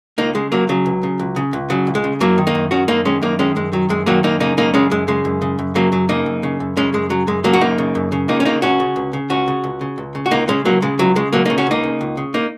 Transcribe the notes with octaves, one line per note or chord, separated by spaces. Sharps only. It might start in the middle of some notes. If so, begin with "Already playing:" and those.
C#2 A#3 D#4
C#3 G#3
C#2 F#3 A#3
C#3 F#3
C#2
C#3
C#2
C#3
C#2
C#3 F#3
C#2
G#3
C#3
F#2 F#3 A#3
D#3
A#3 D#4
F#2
D#3 C#4 F#4
F#2 A#3 D#4
D#3 G#3 C#4
F#2 A#3 D#4
D#3 G#3 C#4
F#2 G#3
D#3 F#3
F#2 G#3
D#3 F#3 A#3
F#2 A#3 D#4
C#3 A#3 D#4
F#2 A#3 D#4
C#3 G#3 C#4
F#2 G#3
C#3 G#3
F#2
C#3
F#2
C#3 F#3 A#3
F#2 F#3
C#3 A#3 D#4
F#2
C#3
F#2
C#3 G#3 C#4
F#2 G#3
C#3 F#3
F#2 G#3
C#3 F#3 A#3
F#4
F#2 A#3 D#4
C#3
F#2
C#3
C#2 A#3 D#4
C#4
C#3 A#3 D#4
C#2 C#4 F#4
C#3
C#2
C#3
C#2 C#4 F#4
C#3
C#2
C#3
C#2
C#3
F#4
C#2 A#3 D#4
C#3 G#3 C#4
C#2 F#3 A#3
C#3 G#3
C#2 F#3
C#3 G#3
C#2 F#3 A#3
A#3 D#4
C#3
C#4 F#4
C#2 A#3 D#4
C#3
C#2
C#3
A#3 D#4